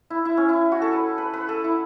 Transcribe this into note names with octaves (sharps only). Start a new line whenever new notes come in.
E4
E4
C#4
E4
F#4
A4
B4
B4
B4
A4
E4